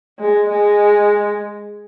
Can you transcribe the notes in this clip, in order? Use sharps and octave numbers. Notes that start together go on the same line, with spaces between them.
G#3
G#3